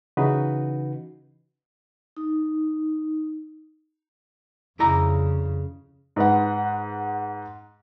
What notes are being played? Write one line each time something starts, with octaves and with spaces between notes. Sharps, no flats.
C#3 E3 D#4 F#4 B4
D#4
F2 C#3 E4 D5 A#5
G#2 B4 F#5